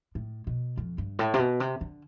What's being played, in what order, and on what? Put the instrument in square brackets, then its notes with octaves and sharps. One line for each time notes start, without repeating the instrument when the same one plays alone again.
[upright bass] A2
B2
F2
G2
A2
C3
B2
C3
D3